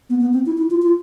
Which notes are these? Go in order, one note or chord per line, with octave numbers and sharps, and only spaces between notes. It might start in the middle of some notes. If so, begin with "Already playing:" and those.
B3
B3
C4
E4
E4
F4
F4